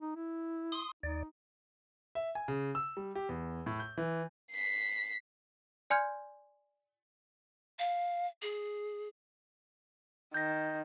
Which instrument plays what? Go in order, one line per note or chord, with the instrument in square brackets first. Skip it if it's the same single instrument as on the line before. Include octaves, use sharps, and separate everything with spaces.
[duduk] D#4
E4
[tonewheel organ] C6 D#6
[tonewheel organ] D#2 D5 [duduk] D#4
[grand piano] E5
G#5
C#3
E6
G3
G4
E2
A2
G6
E3
[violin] B6 C7
[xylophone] D5 G#5 C6 F6 G6 G#6
[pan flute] F5
G#4
[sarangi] D#3 [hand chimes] G6 A#6